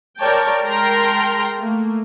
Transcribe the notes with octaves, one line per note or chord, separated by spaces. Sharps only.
A#4 C#5 D5 G5 A5
G#3 A#4 G5 A5 A#5 C6
A3 A#3